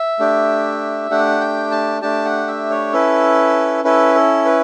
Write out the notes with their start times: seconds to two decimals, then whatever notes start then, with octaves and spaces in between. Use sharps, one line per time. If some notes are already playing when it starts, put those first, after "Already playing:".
Already playing: E5
0.19 A3 D4 G4
1.10 A3 D4 G4 F#5
1.40 G5
1.71 A5
2.02 A3 D4 G4 A5
2.25 F#5
2.47 E5
2.70 C#5
2.93 C#4 E4 A4 B4
3.84 C#4 E4 A4 B4
4.15 A4
4.45 B4